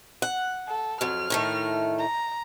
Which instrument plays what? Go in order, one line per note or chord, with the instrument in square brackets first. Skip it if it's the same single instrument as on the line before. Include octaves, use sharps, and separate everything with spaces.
[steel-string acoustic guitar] F#5
[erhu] A4
[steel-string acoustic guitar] F2 F#3 [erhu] F6
[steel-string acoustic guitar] A2 D#3 A3
[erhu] A#5